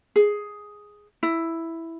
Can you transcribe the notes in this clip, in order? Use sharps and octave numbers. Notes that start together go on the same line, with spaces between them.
G#4
E4